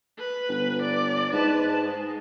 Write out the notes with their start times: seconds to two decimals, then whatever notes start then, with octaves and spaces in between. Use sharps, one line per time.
0.18 B4
0.49 G1
0.82 D5
1.33 G#2 B4 A5
1.80 G#3